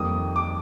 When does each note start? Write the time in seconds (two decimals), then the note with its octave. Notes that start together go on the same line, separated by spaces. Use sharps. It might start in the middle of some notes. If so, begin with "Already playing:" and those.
Already playing: F2 D#3 G3 A#3 D#6
0.36 D6